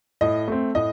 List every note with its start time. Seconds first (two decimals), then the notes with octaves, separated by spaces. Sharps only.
0.21 A2 D#5
0.48 A3 C4
0.75 A2 D#5